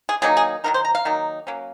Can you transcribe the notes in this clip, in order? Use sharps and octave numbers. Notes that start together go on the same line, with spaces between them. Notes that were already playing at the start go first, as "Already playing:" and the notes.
G#4
D#3 F#3 A#3 D#4 G#4
G#4
D#3 F#3 A#3 D#4 A#4
C5
A#5
F5
D#3 F#3 A#3 D#4
F#3 A#3 C#4